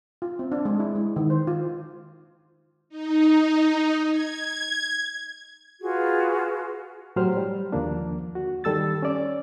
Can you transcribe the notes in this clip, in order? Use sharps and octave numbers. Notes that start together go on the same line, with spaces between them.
F4
C4
D4
G#3
E4
G#3
D#3
C5
F4
D#4
G#6
F4 F#4 G#4 B4
A2 F#3 G4 C5 F6
G3
D#2 D3 F3 A#3 D4
F#4
D#3 G3 A4 E6 A6
C#4 D5